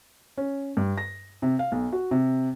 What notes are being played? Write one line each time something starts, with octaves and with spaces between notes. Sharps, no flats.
C#4
G2
A#6
C3
F5
B1
F#4
C3